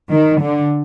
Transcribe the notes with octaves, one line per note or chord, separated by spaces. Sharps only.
D#3
D3